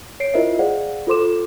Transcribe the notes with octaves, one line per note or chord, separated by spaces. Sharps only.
C#5 C7 D7
E4 F4 A#4 C5 D#5 E5
G#4 C5 D5 F5 F#5
F4 A4 C5 C6 D6 E7